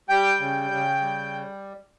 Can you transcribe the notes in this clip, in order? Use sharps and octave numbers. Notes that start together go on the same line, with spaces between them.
G3 G5
C#3
C#3
G3